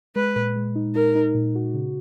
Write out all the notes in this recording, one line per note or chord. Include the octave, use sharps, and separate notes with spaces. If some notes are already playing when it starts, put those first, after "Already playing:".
G#3 B4
A#2
G#3
D#4
D#4 A#4
D#4
A#2
F#4
C#3